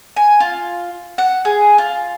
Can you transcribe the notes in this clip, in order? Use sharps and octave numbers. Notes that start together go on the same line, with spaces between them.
G#5
F4
F#5
G#4
F4